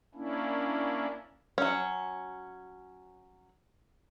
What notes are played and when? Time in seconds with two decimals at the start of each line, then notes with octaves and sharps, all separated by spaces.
0.15 A#3 C#4 D4 E4
1.58 F#3 C#4